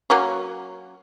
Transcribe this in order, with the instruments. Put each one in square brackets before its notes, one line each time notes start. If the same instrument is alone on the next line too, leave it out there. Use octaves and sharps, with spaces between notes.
[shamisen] F#3 A#3 C#4